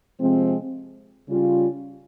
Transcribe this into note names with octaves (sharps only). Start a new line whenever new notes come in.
C3 F3 G#3 C4
C#3 G3 C#4 F4